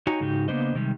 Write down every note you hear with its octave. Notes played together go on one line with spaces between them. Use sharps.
D#4 F#4 G4 C#5 G#5 A#5
G#2 C#3 D#4 F#4 G4
C#3 A#3 B3 D4 C5 D#5
C3 D#3 G3 G#3